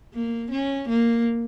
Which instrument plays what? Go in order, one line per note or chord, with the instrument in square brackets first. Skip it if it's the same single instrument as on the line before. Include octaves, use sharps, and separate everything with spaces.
[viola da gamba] A#3
C#4
A#3